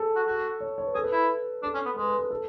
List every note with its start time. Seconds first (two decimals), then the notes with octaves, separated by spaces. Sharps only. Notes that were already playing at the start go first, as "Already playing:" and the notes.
Already playing: G#4 A4
0.16 F#4
0.27 F#4
0.61 C#5
0.78 C#5
0.86 B4
0.94 G#4 A4
1.03 B4
1.12 E4
1.63 D4 A4
1.74 C#4
1.85 B3
1.96 G#3 B4
2.08 B4
2.19 A4
2.30 A4